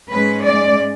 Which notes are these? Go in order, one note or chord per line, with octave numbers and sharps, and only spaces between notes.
G#2 G#3 C#4 B4
D5